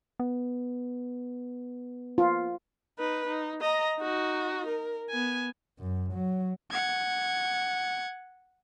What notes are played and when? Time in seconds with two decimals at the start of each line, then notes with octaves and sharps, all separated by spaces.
0.20 B3
2.18 F4
2.98 D#4 B4
3.27 D#4
3.61 D#5 A#5
3.97 D#4 F#4
4.67 A#4
5.10 B3 G#5
5.78 F#2
6.13 F#3
6.71 F#5 G#6